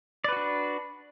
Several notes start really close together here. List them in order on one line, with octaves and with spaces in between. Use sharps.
D5 B4 F#4 D4